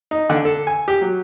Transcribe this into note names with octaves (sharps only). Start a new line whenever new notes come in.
D#4
D3
A4
G#5
G4
F#3